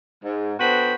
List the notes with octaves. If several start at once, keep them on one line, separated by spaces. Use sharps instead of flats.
G#2
D3 B3 F#4 C5 G5 B5